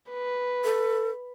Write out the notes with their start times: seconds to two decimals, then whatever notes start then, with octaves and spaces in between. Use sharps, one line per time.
0.10 B4
0.64 A4